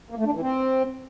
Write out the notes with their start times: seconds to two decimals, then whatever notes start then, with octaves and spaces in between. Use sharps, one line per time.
0.10 A#3
0.18 A3
0.26 D4
0.33 E3
0.41 C4